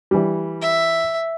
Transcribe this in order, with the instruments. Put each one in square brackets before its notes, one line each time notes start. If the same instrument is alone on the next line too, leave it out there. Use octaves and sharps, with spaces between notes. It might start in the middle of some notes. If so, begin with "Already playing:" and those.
[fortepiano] E3 G3
[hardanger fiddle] E5